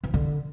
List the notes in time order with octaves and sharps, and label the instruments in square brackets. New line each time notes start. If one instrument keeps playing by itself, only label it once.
[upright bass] E3
D3